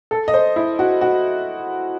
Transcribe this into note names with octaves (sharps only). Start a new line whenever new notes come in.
A4
D#5
C5
E4
F#4
F#4